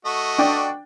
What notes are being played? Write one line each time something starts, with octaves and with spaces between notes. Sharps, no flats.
A3 F#4 D#5
D4 G5